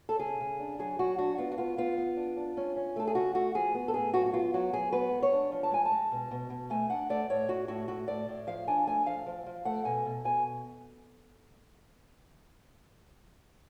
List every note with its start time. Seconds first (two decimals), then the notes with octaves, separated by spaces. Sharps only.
0.09 A4
0.19 C#3 G#4
0.40 C#3
0.60 D4
0.79 F#3 G#4
0.99 F#3 F#4
1.18 D4 F#4
1.38 B3 F4
1.52 F#4
1.58 B3 F4
1.77 B3 F4
1.98 B3
2.17 D4
2.37 D4
2.57 C#4
2.76 C#4
2.96 A3 A4
3.08 G#4
3.15 C#3 F#4
3.35 A3 F#4
3.55 F3 G#4
3.74 B3
3.88 A4
3.94 A2 G#4
4.14 F#3 F#4
4.26 F#4
4.33 B3 F4
4.54 F#3 F#4
4.73 F#3 G#4
4.93 B3 B4
5.12 G#3
5.23 C#5
5.33 D4
5.52 F3
5.63 A5
5.71 G#3 G#5
5.85 A5
5.92 G#3
6.11 B2
6.31 B2
6.50 B2
6.70 A3 G#5
6.90 D4 F#5
7.09 A3 D5
7.29 A2 C#5
7.49 A2 F#4
7.68 A2 F#4
7.88 A2 F#4
8.08 A2 D5
8.28 A2
8.47 F3 F5
8.67 D4 G#5
8.87 A3 G#5
9.06 F3 F5
9.26 F3
9.46 F3
9.65 A3 F#5
9.85 B2 G#5
10.06 B2
10.25 B2 G#5